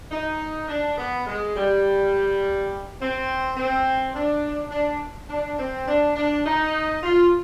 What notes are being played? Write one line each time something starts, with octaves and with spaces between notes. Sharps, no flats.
D#4
D4
B3
G#3
G3
C4
C4
D4
D4
D4
C4
D4
D4
D#4
F4